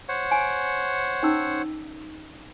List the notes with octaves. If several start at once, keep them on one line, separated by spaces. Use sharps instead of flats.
C5 C#5 F#5
G#5
C#4 D#4 E6